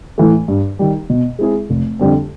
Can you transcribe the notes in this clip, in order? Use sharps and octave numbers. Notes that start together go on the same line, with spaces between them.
A2 E3 A3
G2
D#3 G3
B2
G#3 C4 E4 G#4
F1
F2 D3 G3 C4